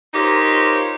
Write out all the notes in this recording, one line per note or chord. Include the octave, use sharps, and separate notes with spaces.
D#4 F4 G4 A#4 C5 C#5